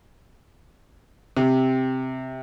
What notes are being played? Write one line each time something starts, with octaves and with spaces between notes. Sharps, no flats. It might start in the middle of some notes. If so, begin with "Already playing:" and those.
C3